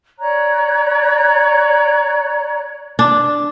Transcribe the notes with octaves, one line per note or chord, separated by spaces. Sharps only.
C#5 D5 A#5 F#6
D4